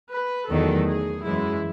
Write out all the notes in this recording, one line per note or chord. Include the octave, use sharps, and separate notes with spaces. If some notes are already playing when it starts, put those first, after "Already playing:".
B4
E2 D#3 F#3 A3 A4
G#4
F#2 E3 G#3 E4